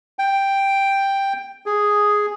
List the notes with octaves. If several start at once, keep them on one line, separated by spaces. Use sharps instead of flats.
G5
G#4